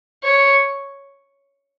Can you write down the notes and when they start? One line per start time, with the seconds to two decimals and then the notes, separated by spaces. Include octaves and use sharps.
0.23 C#5